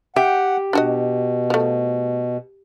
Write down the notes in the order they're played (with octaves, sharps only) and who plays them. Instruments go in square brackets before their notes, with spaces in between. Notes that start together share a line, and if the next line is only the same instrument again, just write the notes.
[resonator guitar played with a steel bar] G4 [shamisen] E5 [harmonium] F#5
[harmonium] B2 [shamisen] D4 F#4 D#5
[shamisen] F3 A3